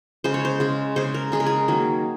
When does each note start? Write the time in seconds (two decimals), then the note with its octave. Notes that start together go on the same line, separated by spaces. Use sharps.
0.24 C#3 G#3 C5
0.34 C#5
0.45 C5
0.60 C#3 G#3
0.96 C#3 G#3 C5
1.14 A#4
1.32 C#3 G#3 G#4
1.40 A#4
1.46 G#4
1.68 D#3 F#3 A#3